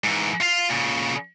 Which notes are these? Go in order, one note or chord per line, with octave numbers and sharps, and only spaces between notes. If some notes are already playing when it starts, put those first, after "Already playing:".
G#2 E3
F4 F5
A#2 C#3